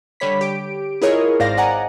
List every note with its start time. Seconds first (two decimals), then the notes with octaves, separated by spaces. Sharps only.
0.20 D3 G3 C#5 B5 B6
0.41 G4 D7
1.01 E4 F4 G#4 A#4 C#5 D#5
1.40 G#1 G#2 C5 D5 F5 A#6
1.57 D5 D#5 F#5 G#5 A#5